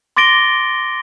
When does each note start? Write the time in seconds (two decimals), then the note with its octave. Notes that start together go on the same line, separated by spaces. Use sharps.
0.17 C6 D6 A6 A#6 D7 G7